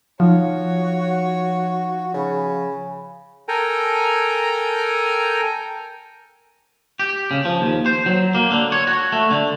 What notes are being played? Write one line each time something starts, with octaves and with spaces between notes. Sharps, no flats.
F3 D#4 F#4 C#5
C#3 G#5 B5
A4 A#4 G5 G#5 A#5
G4
C#3
F3
D#2
C5
F#3
A#3
D3
C#5
F#4
A3
D3